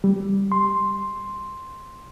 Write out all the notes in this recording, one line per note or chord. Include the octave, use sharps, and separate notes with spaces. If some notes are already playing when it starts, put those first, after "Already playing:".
G3
C6